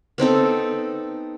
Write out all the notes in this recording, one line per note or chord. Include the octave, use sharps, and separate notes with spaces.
B3 C4 D#4 A4